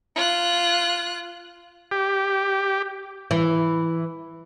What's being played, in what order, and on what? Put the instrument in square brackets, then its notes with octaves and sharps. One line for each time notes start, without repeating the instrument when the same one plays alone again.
[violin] F4 F#6
[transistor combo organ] G4
[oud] E3